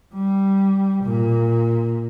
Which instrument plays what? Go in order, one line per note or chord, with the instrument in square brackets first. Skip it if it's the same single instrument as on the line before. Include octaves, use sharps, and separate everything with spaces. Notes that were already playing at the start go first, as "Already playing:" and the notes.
[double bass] G3
A#2